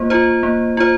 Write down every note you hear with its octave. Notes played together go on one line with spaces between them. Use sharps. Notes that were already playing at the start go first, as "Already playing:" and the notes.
Already playing: A#3 F4 C5
F4 C5
A#3
F4 C5